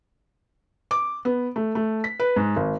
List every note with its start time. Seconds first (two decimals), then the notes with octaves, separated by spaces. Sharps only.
0.91 D6
1.25 B3
1.56 A3
1.75 A3
2.04 B6
2.20 B4
2.36 G#2
2.56 G#1